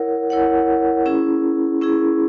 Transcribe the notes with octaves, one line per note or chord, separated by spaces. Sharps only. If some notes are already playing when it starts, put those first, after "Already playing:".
Already playing: E4 A#4 C#5 F#5
E4 A#4 C#5 F#5
C#4 E4 G#4
C#4 E4 G#4